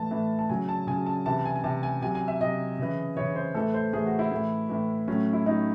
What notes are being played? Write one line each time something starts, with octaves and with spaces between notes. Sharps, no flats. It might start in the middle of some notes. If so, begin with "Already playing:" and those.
Already playing: A2 E3 A5
A2 E3
A5
C#3 F#3 G#5
A5
C#3 F#3 G#5
A5
C3 E3 A5
A5
G#5
G#5
C3 E3 A5
G#5
C3 F#3 G#5
G#5
E5
C3 F#3 D#5
C#3 E3
C#3 E3 C#5
C5
A2 E3 A4
C5
A2 E3 G#4
F#4
E4
A2 E3
A2 E3
A2 F#3 C#4
E4
A2 F#3 D#4